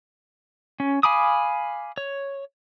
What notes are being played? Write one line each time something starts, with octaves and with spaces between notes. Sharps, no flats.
C#4
F5 G#5 B5 D6 D#6
C#5